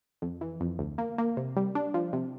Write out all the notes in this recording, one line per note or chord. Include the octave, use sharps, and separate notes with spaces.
F2
E3
F2
D2
A#3
A#3
C3
G3
D4
F3
C3